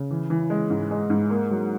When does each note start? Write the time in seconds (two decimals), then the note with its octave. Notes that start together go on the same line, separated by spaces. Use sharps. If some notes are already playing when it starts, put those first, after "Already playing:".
Already playing: C#3
0.11 E3
0.30 E3
0.50 G#3
0.70 G#2
0.91 G#3
1.10 G#2
1.30 A#3
1.51 F#3